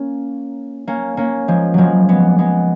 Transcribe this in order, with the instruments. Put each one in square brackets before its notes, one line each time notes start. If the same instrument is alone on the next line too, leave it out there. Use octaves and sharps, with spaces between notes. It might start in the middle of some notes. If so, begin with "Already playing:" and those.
Already playing: [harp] A#3 C#4
A#3 C#4
A#3 C#4
F3 G#3
F3 F#3 G#3
G#3 B3
G#3 B3